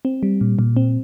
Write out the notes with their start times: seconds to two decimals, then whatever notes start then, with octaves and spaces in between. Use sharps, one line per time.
0.05 C4
0.23 G3
0.41 A#2
0.59 A#2
0.77 C4